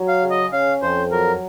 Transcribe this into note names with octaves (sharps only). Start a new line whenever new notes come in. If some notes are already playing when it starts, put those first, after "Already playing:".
Already playing: F#3
F5
C#3
D#5
C#4 F5
F2 C5
F#3 A#4